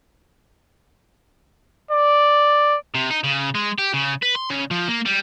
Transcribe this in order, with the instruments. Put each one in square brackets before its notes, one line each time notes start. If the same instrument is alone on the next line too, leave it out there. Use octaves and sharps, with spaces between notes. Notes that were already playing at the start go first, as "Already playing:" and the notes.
[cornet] D5
[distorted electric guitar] C3
D#4
C#3
G#3
G4
C#3
B4
C6
C#3
F3
A#3
G3